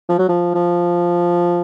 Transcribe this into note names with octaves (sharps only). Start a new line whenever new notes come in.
F3
F#3
F3
F3